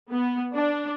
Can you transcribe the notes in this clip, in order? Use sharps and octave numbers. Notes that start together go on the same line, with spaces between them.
B3
D4